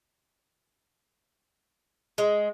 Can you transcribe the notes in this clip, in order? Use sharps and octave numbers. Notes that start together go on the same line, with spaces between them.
G#3